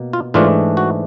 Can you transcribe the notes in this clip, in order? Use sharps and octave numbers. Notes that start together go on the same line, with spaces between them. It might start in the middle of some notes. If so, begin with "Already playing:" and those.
Already playing: B2 A#3
F4
G#2 E3 A3 D4 F4
F#4